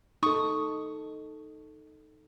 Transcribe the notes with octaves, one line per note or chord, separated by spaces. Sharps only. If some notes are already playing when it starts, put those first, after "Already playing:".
D#4 A4 C#6 D#6